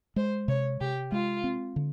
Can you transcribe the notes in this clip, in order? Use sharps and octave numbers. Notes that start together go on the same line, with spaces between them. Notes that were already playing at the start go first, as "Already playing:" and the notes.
G#3 C5
C3 C#5
C3 G4
G#3 F4
C4
D3